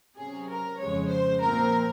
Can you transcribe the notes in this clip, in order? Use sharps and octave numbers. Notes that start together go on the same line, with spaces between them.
C3 F#3 C#4 G#4
A#4
F2 C#3 G#3 C#5
C5
A#2 F3 C4 A#4